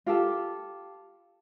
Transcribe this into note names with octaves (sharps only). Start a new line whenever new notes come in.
F4 G4 A4